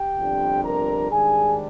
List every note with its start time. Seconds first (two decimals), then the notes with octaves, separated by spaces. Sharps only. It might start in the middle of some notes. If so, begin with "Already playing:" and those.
Already playing: G4 G5
0.17 G1 F2 C3 G3 D4
0.64 A#4 A#5
1.11 G#2 D#3 G3 D4 G#4 G#5